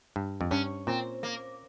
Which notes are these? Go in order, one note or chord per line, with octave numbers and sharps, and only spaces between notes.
G2
F2
G2 C#4
A#2 C4
A#3